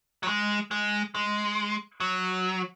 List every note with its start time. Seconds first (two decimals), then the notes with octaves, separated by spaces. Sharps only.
0.23 F#3
0.28 G#3
0.71 G#3
1.15 G#3
2.00 F#3